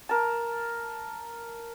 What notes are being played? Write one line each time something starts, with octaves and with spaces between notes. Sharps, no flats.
A#4 A5